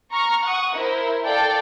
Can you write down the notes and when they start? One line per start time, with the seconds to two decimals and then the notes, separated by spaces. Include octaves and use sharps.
0.11 A#5 C#6 F6
0.42 F#5 C#6 D#6
0.73 E4 A#4 C5
1.25 A4 D5 F5 G5